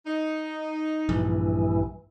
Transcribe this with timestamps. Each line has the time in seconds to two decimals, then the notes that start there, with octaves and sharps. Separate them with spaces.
0.07 D#4
1.09 A#1 G2 E3